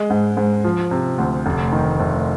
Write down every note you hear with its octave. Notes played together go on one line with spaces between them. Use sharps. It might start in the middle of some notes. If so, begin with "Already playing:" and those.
Already playing: G#3
G#2
G#2
F3
C3
D2
F1
D#3
F1